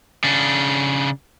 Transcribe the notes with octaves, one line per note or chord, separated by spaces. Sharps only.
C#3 D4